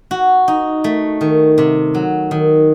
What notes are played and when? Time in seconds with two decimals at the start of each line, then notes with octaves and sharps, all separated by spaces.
0.11 F#4
0.48 D#4
0.84 A3
1.21 D#3
1.58 C3
1.95 F#3
2.31 D#3